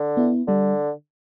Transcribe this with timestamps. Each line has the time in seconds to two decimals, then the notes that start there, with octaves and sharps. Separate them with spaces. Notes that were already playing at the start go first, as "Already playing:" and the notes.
Already playing: D3
0.17 B3 E4
0.47 D3 G3